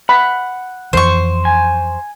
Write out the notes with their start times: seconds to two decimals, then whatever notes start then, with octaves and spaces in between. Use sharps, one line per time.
0.09 F#5 B5
0.93 F2 E3 C5 C#6
1.45 G#5